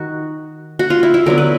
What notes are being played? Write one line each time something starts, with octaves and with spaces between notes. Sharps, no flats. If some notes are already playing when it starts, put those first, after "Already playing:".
Already playing: D#3 D#4 F#4
F#4
F4
E4
E4
D3 F#3 B3 A#4
B4